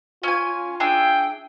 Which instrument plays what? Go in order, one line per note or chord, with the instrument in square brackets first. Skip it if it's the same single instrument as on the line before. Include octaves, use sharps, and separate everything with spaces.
[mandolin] C#4 G#5 [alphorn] F4
[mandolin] D4 G#4 E5 [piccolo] G5